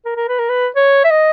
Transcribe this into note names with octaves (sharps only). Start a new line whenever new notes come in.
A#4
A#4
B4
A#4
B4
C#5
E5
D#5